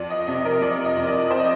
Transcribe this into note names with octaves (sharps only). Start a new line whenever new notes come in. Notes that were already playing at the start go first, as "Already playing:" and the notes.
Already playing: F2 D5
D#5
C3 D#5
A#4
F2 D5
D#5
F2
D5
C5
D#5